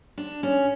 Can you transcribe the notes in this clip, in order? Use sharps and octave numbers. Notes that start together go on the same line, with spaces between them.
D4
C#4